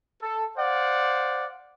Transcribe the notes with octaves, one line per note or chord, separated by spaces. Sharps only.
A4
C5 D5 F5 F#5